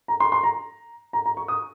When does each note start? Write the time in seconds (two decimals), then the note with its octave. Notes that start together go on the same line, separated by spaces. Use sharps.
0.08 A#5
0.20 C6
0.32 C6
0.43 A#5
1.13 A#5
1.26 A#5
1.37 C#6
1.48 D#6